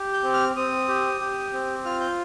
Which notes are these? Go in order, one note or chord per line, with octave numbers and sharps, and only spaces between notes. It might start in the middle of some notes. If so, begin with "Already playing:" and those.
Already playing: G4
G6
C4
F6
C4 D#6
G4
G4
C4
F4 F6
G6